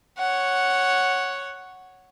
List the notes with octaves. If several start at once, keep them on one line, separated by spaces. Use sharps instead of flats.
C#5 F#5